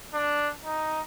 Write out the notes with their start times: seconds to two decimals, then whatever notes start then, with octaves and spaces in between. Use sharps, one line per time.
0.14 D4
0.65 D#4